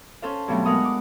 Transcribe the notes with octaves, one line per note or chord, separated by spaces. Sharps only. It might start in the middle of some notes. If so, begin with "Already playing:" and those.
C#4 A4 C5 F5
G2 B2 F#3 A3 C4
G#3 B3 A#4 F5 F#5 D#6
D6